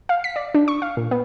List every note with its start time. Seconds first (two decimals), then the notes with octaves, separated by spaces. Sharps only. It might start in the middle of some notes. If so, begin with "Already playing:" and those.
0.09 F5
0.24 B6
0.36 D5
0.54 D4
0.68 C#6
0.82 F5
0.97 A#2
1.11 B3